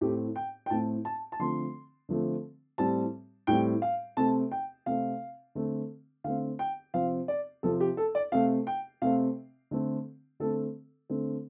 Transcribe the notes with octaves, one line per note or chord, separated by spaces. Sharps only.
A2 A3 C4 G4
G5
G5
A2 A3 C4 A5
A5
A5
D3 F3 A3 C4 C6
D3 F3 A3 C4
A2 G3 C4 A5
A2 G3 C4 G5
F5
C3 A3 C4 A5
G5
C3 A3 C4 F5
D3 A3 C4
D3 A3 C4 F5
G5
C3 F3 C4 F5
D5
C3 F3 C4 A4
G4
A4
D5
C3 A3 C4 F5
G5
C3 A3 C4 F5
D3 A3 C4
D3 A3 C4 A4
D3 A3 C4